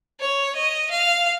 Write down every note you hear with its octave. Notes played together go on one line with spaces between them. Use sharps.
C#5
D#5
F5